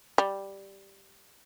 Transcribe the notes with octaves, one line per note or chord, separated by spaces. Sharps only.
G3